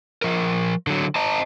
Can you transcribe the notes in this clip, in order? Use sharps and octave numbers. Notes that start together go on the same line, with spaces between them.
F3 A#4
D3 F#3
C5 D#5 A5 A#5